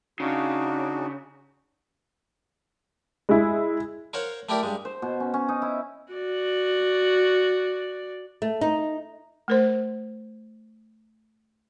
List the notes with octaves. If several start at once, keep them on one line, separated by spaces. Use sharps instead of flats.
C#3 D4 D#4 F#4
G#3 E4
A#4 C5 C#5 F5 F#5
A3 E4 G4 A#4 D5
G2 G#3
C5
B2
C#4
C#4
D#4
E4
F#4 D5
A3
D#4
A3 A#4 C5